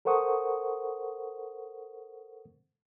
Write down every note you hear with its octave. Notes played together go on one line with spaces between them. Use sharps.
A4 A#4 C5 F#5 C#6 D#6